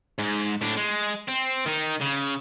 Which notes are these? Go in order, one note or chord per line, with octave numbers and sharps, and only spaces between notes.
G#2
A2 D4
G#3
C4
D#3 D#4
C#3